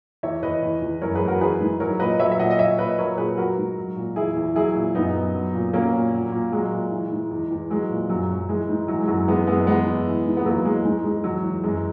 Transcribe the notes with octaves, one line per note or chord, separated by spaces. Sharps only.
E2 C#5 E5
E2 B4 D#5
E2
E2
F#2 A#4 C#5
G#4 B4
F#2
F#4 A#4
E3 G#4 B4
G#2
F#3 A#4 C#5
A#2 B4 D#5
F#3 C#5 E5
E5
A#2 D#5 F#5
D#5
F#3 C#5 E5
A#2 B4 D#5
F#3 A#4 C#5
A#2 G#4 B4
F#3 F#4 A#4
G#2
F#3
A#2
E2 E4 G#4
E2
F#3 E4 G#4
A#2
F#2 B3 D#4
F#2
F#3
A#2
F#3 A#3 C#4
A#2
F#3
A#2
F#3 G#3
A#2
E3
G#2
E2
E2
F#3 G#3
A#2
F#2 F#3
F#2
E3 G#3
G#2
E3 F#3
G#3
F#2 F#3
E3 G#3 B3
F#2 G#3 B3
E2 G#3 B3
E2
E3
G#2
B3
E2 F#3 A#3
E2 G#3
G#2 G#3
G#2 G#3
E2 F#3
E2
F#2 G#3